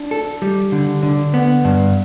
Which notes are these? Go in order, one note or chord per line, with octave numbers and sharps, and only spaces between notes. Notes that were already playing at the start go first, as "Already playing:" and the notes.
Already playing: D4
A4
G3
D3
D3
B3
G2